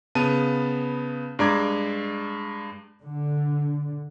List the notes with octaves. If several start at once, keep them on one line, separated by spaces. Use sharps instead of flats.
C#3 B3 A5 D#7
G2 G#3 D5 A#5 D6 G#6
D3